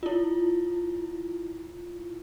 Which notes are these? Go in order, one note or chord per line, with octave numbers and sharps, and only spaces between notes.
E4 F4